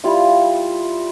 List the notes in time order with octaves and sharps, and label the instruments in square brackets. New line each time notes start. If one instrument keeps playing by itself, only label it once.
[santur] G3 E4 F4 F5